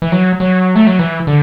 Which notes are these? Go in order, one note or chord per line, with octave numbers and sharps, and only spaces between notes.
E3
F#3
F#3
A3
F#3
E3
D3